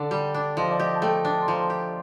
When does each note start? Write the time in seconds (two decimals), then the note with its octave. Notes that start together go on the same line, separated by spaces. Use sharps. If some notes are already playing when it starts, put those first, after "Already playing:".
Already playing: D3 D4 D5
0.11 G3
0.34 D4
0.57 F3 D#5
0.71 D5
0.79 G4 D#5
0.94 A5
1.02 A3 G5
1.25 D4 A5
1.41 C6
1.47 F3 A#5
1.70 G4